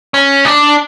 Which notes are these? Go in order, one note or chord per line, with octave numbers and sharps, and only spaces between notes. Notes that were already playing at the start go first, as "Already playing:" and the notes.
C#4
D4